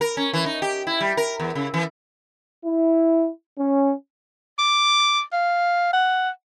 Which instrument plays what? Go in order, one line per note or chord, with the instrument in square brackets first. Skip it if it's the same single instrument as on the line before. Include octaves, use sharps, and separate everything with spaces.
[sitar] A#4
C#4
E3
D#4
G4
E4
G3
A#4
E2
C#3
E3
[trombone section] E4
C#4
[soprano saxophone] D6
F5
F#5